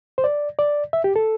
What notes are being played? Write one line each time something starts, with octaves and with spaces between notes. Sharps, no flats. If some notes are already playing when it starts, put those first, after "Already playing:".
C5
D5
D5
E5
G4
A4